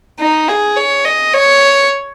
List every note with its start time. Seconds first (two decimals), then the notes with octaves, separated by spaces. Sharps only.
0.20 D#4
0.48 G#4
0.77 C#5
1.05 D#5
1.34 C#5